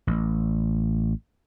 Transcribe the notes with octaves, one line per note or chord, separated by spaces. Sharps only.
A1